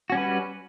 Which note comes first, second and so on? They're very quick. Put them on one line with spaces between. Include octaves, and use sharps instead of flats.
F#4 C#4 G3 B4